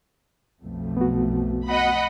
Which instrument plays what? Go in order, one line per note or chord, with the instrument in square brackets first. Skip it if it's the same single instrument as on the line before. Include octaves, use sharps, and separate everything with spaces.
[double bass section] B1 F2 A3
[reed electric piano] B3 F#4
[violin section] D#5 F#5 B5